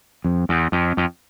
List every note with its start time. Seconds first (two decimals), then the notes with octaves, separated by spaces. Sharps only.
0.24 F2
0.49 E2
0.72 F2
0.97 F2